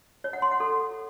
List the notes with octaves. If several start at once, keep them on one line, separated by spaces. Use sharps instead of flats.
C#5
F#5
C6
F#5
A4